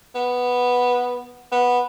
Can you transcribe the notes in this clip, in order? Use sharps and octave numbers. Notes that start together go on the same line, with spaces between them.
B3
B3